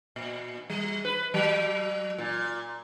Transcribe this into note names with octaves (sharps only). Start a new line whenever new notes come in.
A#2
G3
B4
F#3
A#2